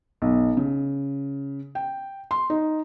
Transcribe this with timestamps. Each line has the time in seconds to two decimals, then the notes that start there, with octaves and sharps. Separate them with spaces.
0.22 B1
0.57 C#3
1.75 G5
2.31 C6
2.50 D#4